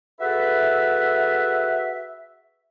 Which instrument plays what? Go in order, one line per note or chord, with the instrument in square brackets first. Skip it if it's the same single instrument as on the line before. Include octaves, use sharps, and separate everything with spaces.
[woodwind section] F#4 G#4 A4 B4 E5